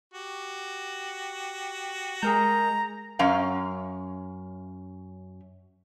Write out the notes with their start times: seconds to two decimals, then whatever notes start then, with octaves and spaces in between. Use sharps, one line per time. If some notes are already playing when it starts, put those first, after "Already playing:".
0.14 F#4 G4
2.23 G#3 G#4 A#4 A#5 G6
3.19 F#2 C#4 F5